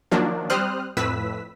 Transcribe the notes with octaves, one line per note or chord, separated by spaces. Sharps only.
D#3 F3 F#3 A#3 D4
G3 C4 C5 D#6 F6 F#6
F2 A2 B4 E6 B6